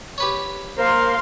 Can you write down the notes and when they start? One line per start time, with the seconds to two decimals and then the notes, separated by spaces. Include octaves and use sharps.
0.18 G4 B4 C#5
0.78 A#3 A#4 C5 F5 C6